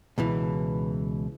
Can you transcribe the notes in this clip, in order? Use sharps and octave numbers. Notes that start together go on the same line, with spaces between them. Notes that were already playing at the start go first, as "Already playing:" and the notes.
C#2 B2 E3